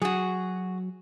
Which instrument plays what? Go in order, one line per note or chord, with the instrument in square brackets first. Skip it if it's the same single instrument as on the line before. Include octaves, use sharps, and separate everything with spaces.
[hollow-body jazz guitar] F#3 [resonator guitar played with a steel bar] F#4 G#4